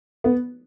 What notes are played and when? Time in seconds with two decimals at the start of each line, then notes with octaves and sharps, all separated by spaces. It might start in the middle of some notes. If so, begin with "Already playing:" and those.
0.24 B3